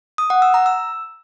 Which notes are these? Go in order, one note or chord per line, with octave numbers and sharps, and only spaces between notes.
D#6
F#5
E6
A#5
E6